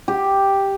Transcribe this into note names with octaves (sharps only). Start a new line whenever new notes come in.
G4